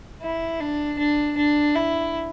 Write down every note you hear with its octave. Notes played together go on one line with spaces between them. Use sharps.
E4
D4
D4
D4
E4